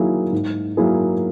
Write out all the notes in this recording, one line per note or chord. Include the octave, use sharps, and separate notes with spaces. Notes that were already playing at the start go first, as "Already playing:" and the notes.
Already playing: D#3 F#3 A#3 E4 G#4
G#2
F#3 A#3 E4 G#4